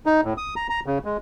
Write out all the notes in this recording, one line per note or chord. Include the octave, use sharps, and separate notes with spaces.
D#4
A2
D#6
A#5
A#5
C#3
G#3